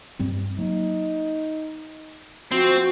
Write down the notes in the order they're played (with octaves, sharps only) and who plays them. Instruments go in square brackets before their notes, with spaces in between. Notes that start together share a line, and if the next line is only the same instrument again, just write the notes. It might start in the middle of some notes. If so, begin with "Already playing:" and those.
[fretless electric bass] G2 G3 C4
[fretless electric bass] F#3 A#3 [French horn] D#4
[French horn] F3 [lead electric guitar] C4 [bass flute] F#4